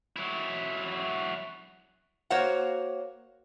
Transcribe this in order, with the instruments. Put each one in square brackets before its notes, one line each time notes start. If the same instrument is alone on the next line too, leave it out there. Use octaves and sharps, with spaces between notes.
[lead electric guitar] F#3 E4
[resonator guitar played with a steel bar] A#3 F#4 C5 C#5 F5 F#5